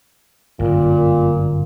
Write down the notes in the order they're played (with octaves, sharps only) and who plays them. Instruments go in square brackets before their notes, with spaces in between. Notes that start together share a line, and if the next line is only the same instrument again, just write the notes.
[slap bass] G1 F#2 [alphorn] A#2